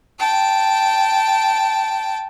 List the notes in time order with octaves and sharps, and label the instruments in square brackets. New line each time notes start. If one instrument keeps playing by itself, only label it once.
[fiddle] G5 A5